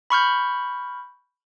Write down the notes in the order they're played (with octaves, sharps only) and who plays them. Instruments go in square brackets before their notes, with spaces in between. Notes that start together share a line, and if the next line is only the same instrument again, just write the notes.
[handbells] B5 C#6 F6 G6